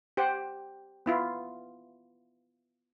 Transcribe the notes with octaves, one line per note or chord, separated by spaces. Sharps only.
G4 C5 F#5 G5
B3 E4 F4